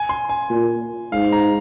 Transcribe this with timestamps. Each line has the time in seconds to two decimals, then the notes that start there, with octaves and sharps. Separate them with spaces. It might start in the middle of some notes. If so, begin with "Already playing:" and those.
Already playing: G#5
0.09 C6
0.29 G#5
0.50 A#2
1.12 G#2 F5
1.32 A#5